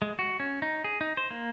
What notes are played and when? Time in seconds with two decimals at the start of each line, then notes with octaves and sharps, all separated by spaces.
0.02 G#3
0.19 F#4
0.40 C#4
0.62 D#4
0.84 G#4
1.01 D#4
1.17 C5
1.31 A#3